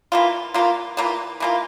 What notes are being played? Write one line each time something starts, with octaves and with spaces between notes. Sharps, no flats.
E3 A#3 F4
E3 A#3 F4
E3 A#3 F4
E3 A#3 F4